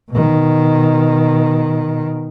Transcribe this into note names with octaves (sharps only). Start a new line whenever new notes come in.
B2 D#3